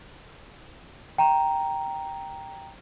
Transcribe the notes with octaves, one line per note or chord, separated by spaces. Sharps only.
G5 A#5